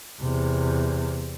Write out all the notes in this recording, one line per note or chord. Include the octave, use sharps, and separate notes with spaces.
E2 C3